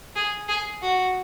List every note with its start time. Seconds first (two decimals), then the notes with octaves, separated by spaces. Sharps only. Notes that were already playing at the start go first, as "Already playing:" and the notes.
0.16 G#4
0.49 G#4
0.82 F#4